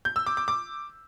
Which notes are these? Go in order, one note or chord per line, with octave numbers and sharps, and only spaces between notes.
G6
E6
D6
D6
D6